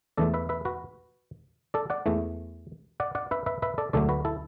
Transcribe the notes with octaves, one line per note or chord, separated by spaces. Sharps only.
E2 E3 A3 A4 D5
B4 E5
B4 E5
F#4 B4
A4 D5
D5 F#5
E2 E3 A3
D5 F#5
D5 F#5
B4 E5
B4 E5
B4 E5
A4 D5
D2 D3 F#3 A3 A4 D5
F#4 B4
E4 A4